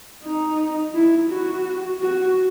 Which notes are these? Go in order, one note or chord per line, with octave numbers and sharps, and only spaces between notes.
D#4
E4
F#4
F#4